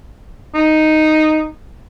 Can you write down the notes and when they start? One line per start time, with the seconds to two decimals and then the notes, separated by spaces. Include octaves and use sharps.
0.54 D#4